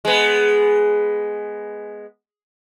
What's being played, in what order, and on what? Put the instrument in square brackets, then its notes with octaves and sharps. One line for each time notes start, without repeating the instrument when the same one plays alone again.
[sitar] G#3 B3